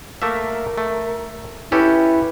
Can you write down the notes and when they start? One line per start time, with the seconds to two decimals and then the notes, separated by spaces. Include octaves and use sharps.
0.22 A3 A#3 A#4 E5
0.78 A3
1.72 C#4 E4 G4 A4 B4